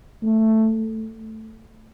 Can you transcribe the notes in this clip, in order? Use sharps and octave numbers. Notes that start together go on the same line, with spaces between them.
A3